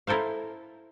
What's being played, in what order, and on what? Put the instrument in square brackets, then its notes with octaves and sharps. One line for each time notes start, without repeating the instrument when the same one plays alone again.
[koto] E4 A4 A#4 C5 F5